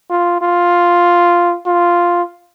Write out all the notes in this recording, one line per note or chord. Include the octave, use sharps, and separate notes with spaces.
F4
F4
F4